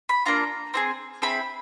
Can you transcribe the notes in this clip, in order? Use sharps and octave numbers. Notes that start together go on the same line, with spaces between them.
B5
A#3 D4 F4 A#5
C4 E4 G#4
C4 E4 G#4 B5